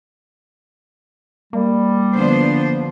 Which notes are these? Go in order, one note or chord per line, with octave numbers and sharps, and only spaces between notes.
G3 A#3
D3 F3 B3 D4 C5